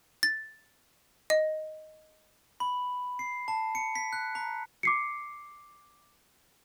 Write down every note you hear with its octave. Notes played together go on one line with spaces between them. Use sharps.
A6
D#5
B5
C7
A5
C#7
B6
F#6
A#5
D6 C7 C#7